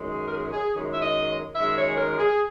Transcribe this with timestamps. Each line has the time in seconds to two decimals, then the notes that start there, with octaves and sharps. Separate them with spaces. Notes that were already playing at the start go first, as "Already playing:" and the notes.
Already playing: F#2 D#3 G#3
0.11 G#4
0.27 A#4
0.32 G#4
0.52 G#4
0.73 F#2 D#3 G#3
0.93 E5
1.01 D#5
1.56 F#2 D#3 G#3 E5
1.77 C#5
1.88 G#4
1.97 A#4
2.18 G#4